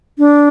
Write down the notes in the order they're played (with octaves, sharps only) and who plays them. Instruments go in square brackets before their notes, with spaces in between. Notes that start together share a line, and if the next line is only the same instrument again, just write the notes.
[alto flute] D4